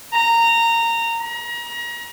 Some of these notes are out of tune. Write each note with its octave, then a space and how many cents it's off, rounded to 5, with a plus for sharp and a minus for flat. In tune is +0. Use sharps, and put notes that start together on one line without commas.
A#5 -15
A#5 +35